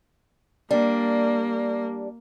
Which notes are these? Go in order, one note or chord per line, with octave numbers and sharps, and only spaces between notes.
G3 A#3 D4